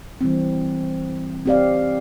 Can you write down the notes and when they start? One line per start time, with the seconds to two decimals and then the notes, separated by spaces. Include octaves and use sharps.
0.21 E3 G3 C4
1.46 C4 G4 D5 F5